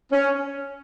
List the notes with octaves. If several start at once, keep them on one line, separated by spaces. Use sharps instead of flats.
C#4